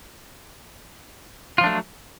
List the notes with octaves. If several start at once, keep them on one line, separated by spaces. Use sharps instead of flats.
F3 F#3 A3 D4 F4